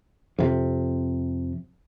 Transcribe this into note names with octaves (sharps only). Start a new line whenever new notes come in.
F2 C3